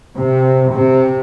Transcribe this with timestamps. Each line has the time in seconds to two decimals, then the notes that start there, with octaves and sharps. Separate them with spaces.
0.17 C3
0.74 C3